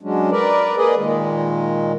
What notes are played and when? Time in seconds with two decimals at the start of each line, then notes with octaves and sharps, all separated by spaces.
0.02 F#3 G#3 C#4 D4
0.31 A#4 B4 D5
0.77 A#3 G#4 B4 D5 D#5
0.97 A#2 D#3 G#3